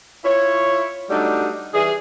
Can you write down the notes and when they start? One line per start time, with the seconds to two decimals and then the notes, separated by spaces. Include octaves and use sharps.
0.24 E4 F4 C#5
1.10 F#3 G3 A3 D4 D#4
1.74 E3 G3 G#4